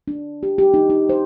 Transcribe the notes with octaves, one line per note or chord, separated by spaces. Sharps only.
D4
G4
G4
D#4
D#4
C5